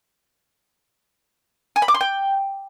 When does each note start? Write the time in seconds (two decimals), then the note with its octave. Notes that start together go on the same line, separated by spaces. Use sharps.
1.76 G#5
1.82 B5
1.88 D6
1.94 C6
2.01 G5